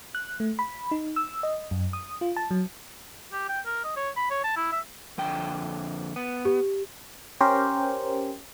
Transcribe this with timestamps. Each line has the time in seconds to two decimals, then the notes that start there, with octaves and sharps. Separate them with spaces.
0.15 F#6
0.40 A3
0.59 B5
0.91 D#4
1.16 E6
1.43 D#5
1.71 F#2
1.93 D#6
2.21 F4
2.36 A5
2.51 F#3
3.33 G4
3.49 G5
3.66 A#4
3.84 D#5
3.97 C#5
4.16 B5
4.31 C#5
4.44 A5
4.57 E4
4.72 E5
5.18 F2 D3 G5
6.16 B3
6.45 G4
7.41 C#4 G4 A#4 C5